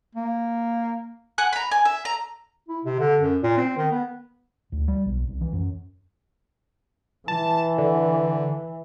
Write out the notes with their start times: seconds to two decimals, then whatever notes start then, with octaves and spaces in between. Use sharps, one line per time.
0.15 A#3
1.38 F#5 G#5 F#6
1.53 A#5 B5
1.72 G#5
1.85 E5
2.05 A#5
2.68 E4
2.85 C3
2.99 D3
3.21 F#2
3.43 A#2
3.58 C4
3.77 D#3
3.92 B3
4.72 D2
4.88 G3
5.06 B1
5.28 C2
5.41 E3
5.53 F#2
7.28 E3 A5
7.78 D3